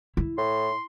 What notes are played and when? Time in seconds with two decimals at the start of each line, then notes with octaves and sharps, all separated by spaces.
0.17 E4
0.38 A2 C6